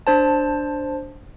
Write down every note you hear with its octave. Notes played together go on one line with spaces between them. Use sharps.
D4 C5 A5